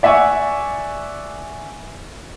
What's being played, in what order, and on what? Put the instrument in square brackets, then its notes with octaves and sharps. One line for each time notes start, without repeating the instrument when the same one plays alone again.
[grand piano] D5 E5 F#5 G#5 C#6